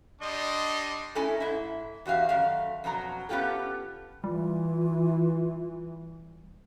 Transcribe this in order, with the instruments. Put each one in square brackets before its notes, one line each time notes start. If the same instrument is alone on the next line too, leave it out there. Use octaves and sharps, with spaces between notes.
[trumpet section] G3 D4 D#5 C6
[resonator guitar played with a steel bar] A3 C#4 D#4 E4 A4 G#5
G#2 E4
E2 F#4 G4 F5
F#2 D#3 A3 F5
F2 B2 F#3 A#5
B3 C#4 F4 G4 A4
[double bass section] E3 [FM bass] G3 [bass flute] F4